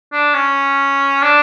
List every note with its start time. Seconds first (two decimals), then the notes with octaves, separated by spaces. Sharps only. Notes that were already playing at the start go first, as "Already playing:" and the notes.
0.12 D4
0.34 C#4
1.23 D4